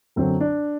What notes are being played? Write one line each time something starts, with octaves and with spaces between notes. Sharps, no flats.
F#2 D3 F#3 C4
D4